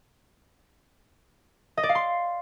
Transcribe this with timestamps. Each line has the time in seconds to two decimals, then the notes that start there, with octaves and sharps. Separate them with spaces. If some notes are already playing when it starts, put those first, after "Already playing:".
1.77 D#5
1.83 D5
1.89 F5
1.95 C6